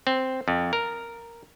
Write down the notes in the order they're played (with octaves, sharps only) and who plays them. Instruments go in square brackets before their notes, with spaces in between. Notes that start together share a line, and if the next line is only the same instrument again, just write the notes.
[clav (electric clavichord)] C4
F2
A#4